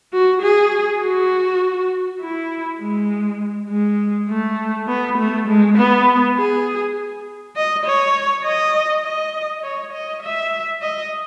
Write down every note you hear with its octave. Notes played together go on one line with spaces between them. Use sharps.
F#4
G#4
F#4
E4
G#3
G#3
A3
B3
A3
G#3
B3
G#4
D#5
C#5
D#5
D#5
C#5
D#5
E5
D#5